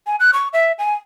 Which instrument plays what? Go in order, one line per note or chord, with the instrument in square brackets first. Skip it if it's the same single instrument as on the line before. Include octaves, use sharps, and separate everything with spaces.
[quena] G#5
F#6
C#6
E5
G#5